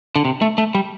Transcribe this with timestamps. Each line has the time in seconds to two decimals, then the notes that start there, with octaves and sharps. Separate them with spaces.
0.16 D3
0.25 C3
0.42 A3
0.58 A3
0.75 G3